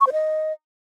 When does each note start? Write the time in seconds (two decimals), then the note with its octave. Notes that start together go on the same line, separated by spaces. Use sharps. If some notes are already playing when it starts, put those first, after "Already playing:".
0.01 C#6
0.07 C5
0.13 D#5